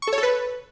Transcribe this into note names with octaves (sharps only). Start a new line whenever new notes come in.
C#6
A4
C#5
A4
B4